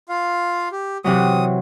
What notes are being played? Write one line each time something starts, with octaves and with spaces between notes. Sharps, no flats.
F4 F5
G4
C3 E3 F#3 D#6